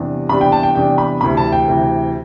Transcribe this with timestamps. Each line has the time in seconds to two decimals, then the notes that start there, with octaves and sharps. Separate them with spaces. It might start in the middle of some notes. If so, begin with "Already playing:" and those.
Already playing: E2 C3 G3 D4
0.29 E2 C3 G3 D4 B5
0.41 G5
0.52 A5
0.63 G5
0.75 E2 C3 G3 D4 G5
0.98 B5
1.21 D2 C3 E3 B5
1.37 A5
1.52 G5
1.68 D2 C3 E3